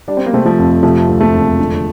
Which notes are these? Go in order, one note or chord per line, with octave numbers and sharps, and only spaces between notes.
G3 D4
C4
A#3
C3 A3 C4
F3 A3
F2
C3 F3 A3
D2
F3 A3
E1
D3